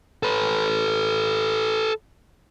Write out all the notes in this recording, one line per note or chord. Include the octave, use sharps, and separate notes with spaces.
A4 B4